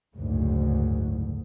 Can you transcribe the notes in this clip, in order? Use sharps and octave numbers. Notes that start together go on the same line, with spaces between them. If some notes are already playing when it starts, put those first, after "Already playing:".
F#1 D2 G#2